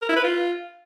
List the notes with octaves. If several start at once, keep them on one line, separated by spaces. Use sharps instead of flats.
A#4
E4
B4
F4